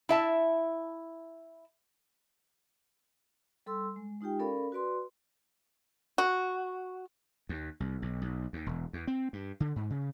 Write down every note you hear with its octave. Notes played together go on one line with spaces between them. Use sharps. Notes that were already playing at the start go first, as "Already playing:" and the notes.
E4 E5 A5
G3 A4 C6 E6
G#3
G#3 D#4 F4 G4 G5
C#4 A4 A#4 D5 F5 B5
F#4 B4 D5 C6
F#4
D#2
C2
B1
B1
D#2
E1
E2
C4
G2
D3
G#2
C#3